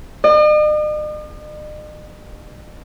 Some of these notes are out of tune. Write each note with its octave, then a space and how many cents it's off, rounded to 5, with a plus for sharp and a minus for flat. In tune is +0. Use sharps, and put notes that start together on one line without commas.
D#5 -45